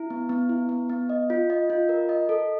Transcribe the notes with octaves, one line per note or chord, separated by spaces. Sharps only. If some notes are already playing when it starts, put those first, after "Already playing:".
Already playing: E4
B3
B3
E4
B3
B3
D#5
F4
D#5
F4
A#4
D#5
A4